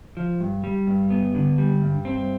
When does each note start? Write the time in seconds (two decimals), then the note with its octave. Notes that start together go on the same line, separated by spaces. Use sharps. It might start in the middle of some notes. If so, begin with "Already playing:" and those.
0.17 F3
0.40 G2
0.64 G3
0.87 G2
1.10 B3
1.35 D3
1.58 G3
1.82 G2
2.05 C4